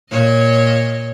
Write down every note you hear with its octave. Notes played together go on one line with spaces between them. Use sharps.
A#2 C#5 D#5